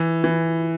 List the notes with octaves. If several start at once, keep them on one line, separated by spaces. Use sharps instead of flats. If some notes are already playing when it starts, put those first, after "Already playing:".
Already playing: E3
E3